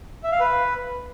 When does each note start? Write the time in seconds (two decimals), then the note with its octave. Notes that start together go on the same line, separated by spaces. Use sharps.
0.24 E5
0.32 F5
0.40 B4